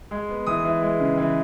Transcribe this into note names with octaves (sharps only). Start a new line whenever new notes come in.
G#3
B3
E3 D#6
E3
G#3
C#3
E3